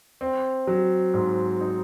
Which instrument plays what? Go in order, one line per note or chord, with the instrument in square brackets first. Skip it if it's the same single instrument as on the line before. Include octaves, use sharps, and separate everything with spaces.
[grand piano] C4
F#3
G#2
D#4